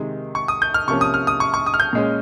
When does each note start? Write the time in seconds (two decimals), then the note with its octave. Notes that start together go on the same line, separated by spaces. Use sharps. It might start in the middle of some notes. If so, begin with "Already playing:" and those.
Already playing: C3 D#3 G#3
0.35 C#6
0.48 D#6
0.62 G6
0.74 F6
0.88 C3 F3 A#3 C#4 C#6
1.01 D#6
1.14 F6
1.27 D#6
1.40 C#6
1.54 C#6
1.66 D#6
1.74 F6
1.80 G6
1.93 A#2 G#3 C#4